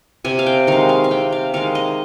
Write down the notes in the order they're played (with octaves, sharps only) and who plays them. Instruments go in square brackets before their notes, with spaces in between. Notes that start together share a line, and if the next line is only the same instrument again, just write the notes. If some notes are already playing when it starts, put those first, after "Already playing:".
[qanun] C3 G#5
F5
G5
D#3 G#3 F5
F5
F5
C3 G5
F5
D#3 G#3 F5
D#5